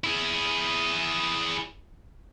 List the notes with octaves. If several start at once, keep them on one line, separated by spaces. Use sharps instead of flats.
E4 G#4